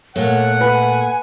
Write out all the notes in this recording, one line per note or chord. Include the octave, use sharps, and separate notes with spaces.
A#2 A3 C#5 F#5
B4 G#5